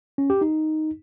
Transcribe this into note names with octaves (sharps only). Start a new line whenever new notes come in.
C#4
G4
D#4